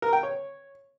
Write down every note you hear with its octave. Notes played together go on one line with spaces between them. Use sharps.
A#4
G5
C#5